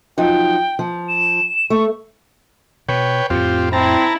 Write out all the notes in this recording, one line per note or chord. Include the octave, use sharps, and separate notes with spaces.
F3 F#3 D#4 G5
F3
E7
A3 C#6
B2 B4 C#5 G5
F2 A2 C4 F4 G4
C4 E4 A5 A#5